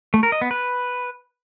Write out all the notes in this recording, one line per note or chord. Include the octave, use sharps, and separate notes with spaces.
A3
A#4
D#5
B3
B4